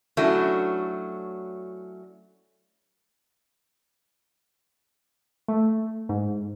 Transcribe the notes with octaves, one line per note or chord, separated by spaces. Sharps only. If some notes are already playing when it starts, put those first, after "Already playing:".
F#3 A3 C#4 D4 E4 F#4
A3
G#2